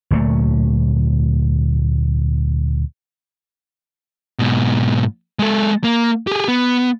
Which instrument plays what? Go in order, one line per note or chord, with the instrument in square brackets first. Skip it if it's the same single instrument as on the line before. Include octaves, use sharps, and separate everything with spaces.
[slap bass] D2 A#2 F#3 A3
[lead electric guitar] G#2 B2
G#3 A4
A#3
G4 G#4
B3